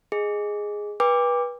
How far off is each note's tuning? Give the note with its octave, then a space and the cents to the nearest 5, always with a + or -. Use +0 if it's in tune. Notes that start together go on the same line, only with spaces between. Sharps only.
G#4 +0 D#5 +0
B4 -25 G5 +40 D6 +0